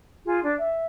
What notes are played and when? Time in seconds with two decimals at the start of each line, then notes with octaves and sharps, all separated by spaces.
0.25 F4 G#4
0.42 D4
0.57 E5